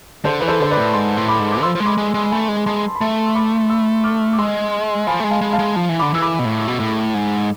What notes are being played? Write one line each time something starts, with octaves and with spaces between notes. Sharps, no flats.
D3 A4 C5
E3 B4
A4 C5
D3 C5
B4 D5
A2
G#2 A5 C6
A2
B5 D6
G#2
D6
F3 C6 E6
F3
G#3
B5 D6
G#3
G#3
A3 G#5 B5
G#3
G#3 A5 C6
B5
A3 A5 C6
E6
B5 D6
C6 E6
D6 F6
D6
G#3 C6 E6
F3 G#5 B5
A3
G#3
F5 A5
G#3
F5 A5
G#3
F3
E3
D3 B5 D6
E3 E6
B5 D6
B2
A2
B2
A2
G#2